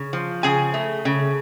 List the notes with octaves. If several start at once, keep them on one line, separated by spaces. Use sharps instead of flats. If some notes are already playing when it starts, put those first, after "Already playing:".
Already playing: C#3
F3
C#3 G#4 G#5
A3
C#3